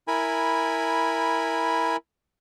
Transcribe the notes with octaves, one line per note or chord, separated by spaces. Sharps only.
E4 A#4 G#5 B5